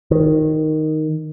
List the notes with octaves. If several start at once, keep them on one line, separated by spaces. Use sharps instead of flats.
D#3